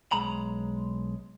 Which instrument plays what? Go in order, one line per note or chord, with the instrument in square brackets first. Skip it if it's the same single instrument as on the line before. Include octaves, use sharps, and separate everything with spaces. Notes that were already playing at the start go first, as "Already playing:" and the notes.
[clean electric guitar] B1 G#3 A#5 B5